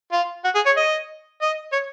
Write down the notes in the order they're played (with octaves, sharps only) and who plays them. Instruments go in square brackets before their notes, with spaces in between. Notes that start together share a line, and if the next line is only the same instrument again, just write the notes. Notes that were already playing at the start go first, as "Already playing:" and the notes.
[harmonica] F4
F#4
G#4
C#5
D#5
D#5
C#5